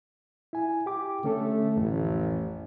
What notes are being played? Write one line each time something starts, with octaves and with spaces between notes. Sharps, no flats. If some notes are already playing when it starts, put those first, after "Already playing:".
E4 G#5
G4 G5 D6
D3 A3 C#4 A4
A1 F2